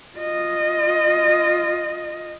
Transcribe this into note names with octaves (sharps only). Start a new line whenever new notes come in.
F4 D#5